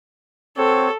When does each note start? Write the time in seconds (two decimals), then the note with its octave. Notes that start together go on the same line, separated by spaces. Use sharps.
0.58 C4 F#4 A4 C#5